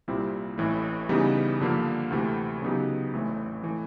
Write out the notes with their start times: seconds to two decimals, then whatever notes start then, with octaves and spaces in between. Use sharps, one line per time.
0.08 C2 A#2 G3 C4 E4
0.58 A1 A2 E3 A3
1.09 C#3 E3 G3 B3 D#4
1.60 G2 D3 F3 A#3
2.10 D2 C3 E3 A3 C4
2.62 C#3 F#3 B3 D#4 G4
3.13 A1 A2 E3 A3 C4
3.63 E3 A3